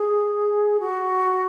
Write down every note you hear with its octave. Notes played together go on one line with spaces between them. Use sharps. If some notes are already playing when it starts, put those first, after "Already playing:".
Already playing: G#4
F#4